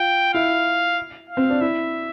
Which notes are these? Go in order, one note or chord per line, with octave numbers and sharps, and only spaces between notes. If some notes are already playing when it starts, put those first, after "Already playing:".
Already playing: F4 G5
E4 F5
F5
C4
D4
E4 E5